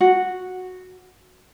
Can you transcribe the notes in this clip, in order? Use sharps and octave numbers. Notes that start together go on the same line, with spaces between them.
F#4